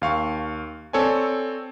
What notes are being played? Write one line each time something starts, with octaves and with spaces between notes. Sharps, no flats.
D#2 F5 C#6
C4 A4 C#5 D5 G#5